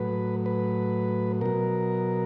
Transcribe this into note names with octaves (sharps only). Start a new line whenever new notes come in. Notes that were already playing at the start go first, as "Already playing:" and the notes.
Already playing: A2 F#3 B4
B4
B2 F#3 A#4